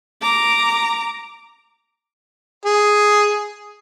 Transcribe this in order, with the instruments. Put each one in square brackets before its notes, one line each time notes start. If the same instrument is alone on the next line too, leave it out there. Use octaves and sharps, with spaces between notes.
[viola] A#5 D6
[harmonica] G#4